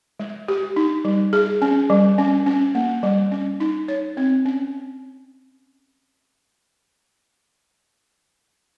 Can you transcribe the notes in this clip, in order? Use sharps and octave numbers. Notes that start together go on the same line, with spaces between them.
G#3
G4
D#4
G3
G#4
C#4
G3
C#4
C#4
A#3
G3
C#4
D#4
C#5
C4
C#4